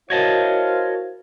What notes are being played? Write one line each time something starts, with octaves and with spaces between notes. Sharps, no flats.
E4 F#4 A#4 C5 C#5 D#5 F5 A5